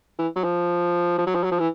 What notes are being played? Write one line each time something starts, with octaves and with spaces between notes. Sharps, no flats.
E3
F#3
F3
F3
F#3
F3
F#3
F3
E3